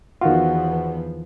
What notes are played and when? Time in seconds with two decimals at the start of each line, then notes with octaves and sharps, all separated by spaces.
0.21 E2 D#3 F3 B3 F4 F#4